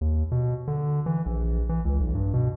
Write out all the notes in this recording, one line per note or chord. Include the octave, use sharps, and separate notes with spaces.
D#2
B2
D3
E3
A#1
E3
C#2
B1
G2
B2